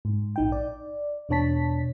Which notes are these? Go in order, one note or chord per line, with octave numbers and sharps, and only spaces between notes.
G#2
A#1 D#4 G5
D5
E2 B2 D4 C#5 A5 B6